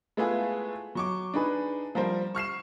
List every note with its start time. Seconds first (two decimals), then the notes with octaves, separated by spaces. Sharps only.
0.17 G#3 A3 B3 E4 F4 G#4
0.95 F#3 C#6 D6
1.34 D4 D#4 G#4 B4
1.95 F3 G3 A#4 C5
2.35 C#6 F6 C7 E7